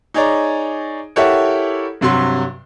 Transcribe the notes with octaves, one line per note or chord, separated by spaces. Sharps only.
D#4 G#4 C#5 D5 A#5
E4 G4 A4 A#4 C#5 F#5
G2 C3 F#3 C6